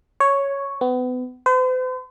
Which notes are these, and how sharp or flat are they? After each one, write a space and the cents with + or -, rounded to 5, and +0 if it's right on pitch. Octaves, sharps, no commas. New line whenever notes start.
C#5 +0
B3 +30
C5 -45